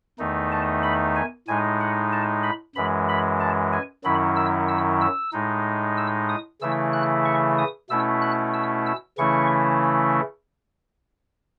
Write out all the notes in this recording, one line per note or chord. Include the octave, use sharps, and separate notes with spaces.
E2 D#3 A3 D#4
A5
B5
G#5
A2 G#3 D#4 G#5
F#5
A5
B5
F#2 E3 G#3 B5
B5
A5
G#5
F#2 D#3 F#3 C#4 E4 B5
E6
E6
E6
A2 G#3 D#4
E6
D#6
C#3 E3 A3 E4 E6
F#6
C#6
D#6
B2 A3 C#4 E4 E6
F#6
E6
E6
C#3 E3 A3 C#4 E4 C#6